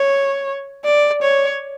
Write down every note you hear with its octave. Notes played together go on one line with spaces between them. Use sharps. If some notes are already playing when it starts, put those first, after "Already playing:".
Already playing: C#5
D5
C#5